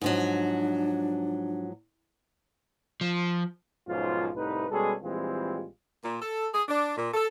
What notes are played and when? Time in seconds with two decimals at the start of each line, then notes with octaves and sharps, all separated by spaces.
0.01 G#2 F3 F#3 D4
3.01 F3
3.88 B1 G#2 F3 C#4 F4
4.36 C2 A2 D#4 B4
4.71 B2 G3 G#3 C#4 G#4 A4
5.03 A#1 E3 G3 G#3 C4 F4
6.04 A#2
6.21 A4
6.53 G#4
6.68 D4
6.97 A#2
7.14 A4